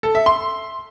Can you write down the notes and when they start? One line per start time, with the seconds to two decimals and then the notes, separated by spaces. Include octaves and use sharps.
0.03 A4
0.15 E5
0.26 C6